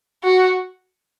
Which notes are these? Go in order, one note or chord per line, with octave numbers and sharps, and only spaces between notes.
F#4